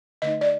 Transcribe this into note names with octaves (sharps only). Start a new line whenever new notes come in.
D3 A3 D#4 D#5
D5